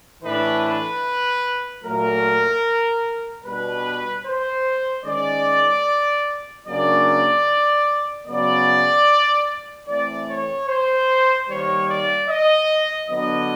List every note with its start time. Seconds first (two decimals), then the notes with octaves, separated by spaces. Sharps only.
0.23 A2 E3 A3 D4 B4
0.64 B4
1.84 A#2 F#3 A3 A#4
3.44 B2 G3 B3 D4 B4
4.26 C5
5.05 D#3 G#3 C#4 D5
6.66 C#3 F#3 A#3 D4 D5
8.26 C#3 F#3 B3 D5
9.87 E3 A3 C4 D5
10.28 C#5
10.68 C5
11.48 D#3 G3 A#3 C#5
11.88 D5
12.29 D#5
13.09 D3 F#3 B3 D#5